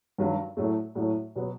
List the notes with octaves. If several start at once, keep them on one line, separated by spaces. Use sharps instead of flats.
G2 D#3 F#3
A2 F#3 A3
A2 F#3 A3
B2 F#3 B3